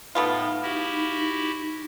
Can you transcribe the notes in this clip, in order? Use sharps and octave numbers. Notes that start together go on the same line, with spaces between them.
A2 A3 B3 D#4 F4
E4 F#4 G4